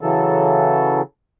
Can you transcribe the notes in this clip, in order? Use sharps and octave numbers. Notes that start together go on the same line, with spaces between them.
C#3 E3 F#3 A4